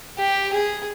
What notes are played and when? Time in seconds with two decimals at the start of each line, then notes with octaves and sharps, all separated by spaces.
0.19 G4
0.53 G#4